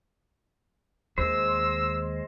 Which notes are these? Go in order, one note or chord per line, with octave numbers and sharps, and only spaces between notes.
D#2 G#3 C5 E6